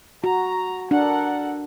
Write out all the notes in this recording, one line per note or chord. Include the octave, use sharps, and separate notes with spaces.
F#4 A#5
D4 A4 A#4 F#5